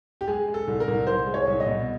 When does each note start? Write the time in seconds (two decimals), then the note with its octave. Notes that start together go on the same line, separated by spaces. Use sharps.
0.21 G4
0.27 G#3 G#4
0.48 G#3
0.54 A4
0.67 C2
0.80 A#4
0.88 C2
1.07 C2 C5
1.27 G#3
1.34 C#5
1.47 C2
1.60 D#5
1.66 B2